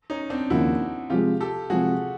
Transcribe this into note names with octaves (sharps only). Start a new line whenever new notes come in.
C#4 D#4
C4 D4
D#2 C#3 F3 A#3 E4 F#4
C3 F3 G#3 F4 G4
G4 A4
C3 F3 G#3 F#4 G#4